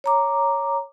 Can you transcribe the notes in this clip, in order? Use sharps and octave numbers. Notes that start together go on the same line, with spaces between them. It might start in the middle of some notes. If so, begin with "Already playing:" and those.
C#5 A#5 D6